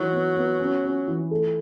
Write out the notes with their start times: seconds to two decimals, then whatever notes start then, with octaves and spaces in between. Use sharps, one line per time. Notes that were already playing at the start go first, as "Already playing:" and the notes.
Already playing: E3 F#3 D#4
0.12 B3
0.35 B3
0.60 C#4
0.84 C#4
1.08 E3
1.31 A3